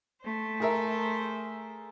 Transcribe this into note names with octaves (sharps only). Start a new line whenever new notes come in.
A3 C5
G#4 A#4 E5